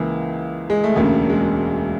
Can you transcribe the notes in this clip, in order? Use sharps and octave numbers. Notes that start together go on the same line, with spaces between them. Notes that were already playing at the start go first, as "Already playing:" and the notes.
Already playing: C#2 C#3 E3 A#3
G#3
A3
E1 D2 C#3 A#3
G#3